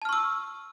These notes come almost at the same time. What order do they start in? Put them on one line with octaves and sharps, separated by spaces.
A5 F6 C#6 E6